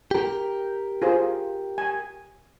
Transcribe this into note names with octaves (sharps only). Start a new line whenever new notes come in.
G4 A#4
F4 G#4 C5
G#5